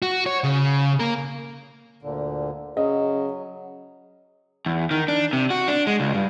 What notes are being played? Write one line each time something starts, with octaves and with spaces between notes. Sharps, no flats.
F#4
C#5
C#3
A#3 A#4
D2 A#2 D3
C#3 F#3 D#5
E2
D#3
D4
C3
F#4
D4
G#3
C#2
G2